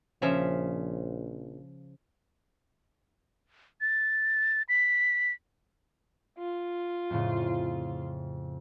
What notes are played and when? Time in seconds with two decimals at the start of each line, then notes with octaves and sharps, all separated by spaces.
0.22 A#1 C#3 F3 E5
3.81 A6
4.69 B6
6.38 F4
7.10 F2 A2 C#3